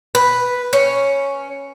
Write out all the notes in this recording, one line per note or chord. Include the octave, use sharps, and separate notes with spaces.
B4
C#4